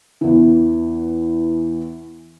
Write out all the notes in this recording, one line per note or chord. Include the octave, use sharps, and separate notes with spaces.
E2 E3